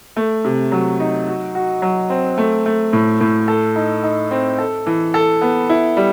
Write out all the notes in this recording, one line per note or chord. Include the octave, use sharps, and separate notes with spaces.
A3
C3
F#3
D#4
F#4
F#4
F#3
C4
A3
A3
A2
A2
A4
D#4
D#4
C4
A4
E3
A4
B3
E4
G3